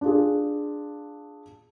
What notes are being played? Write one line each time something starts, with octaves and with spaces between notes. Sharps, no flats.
D4 F4 G#4